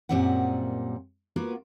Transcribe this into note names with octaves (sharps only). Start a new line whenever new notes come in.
F#2 A#2 G3 C4 E5 F#5
A#3 B3 F4 F#4 A#4 B4